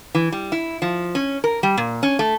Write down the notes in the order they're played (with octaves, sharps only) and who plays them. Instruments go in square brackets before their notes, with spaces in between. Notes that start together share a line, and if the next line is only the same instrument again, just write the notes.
[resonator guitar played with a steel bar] E3
G3
E4
F3
C#4
A#4
G3
A#2
C#4
A3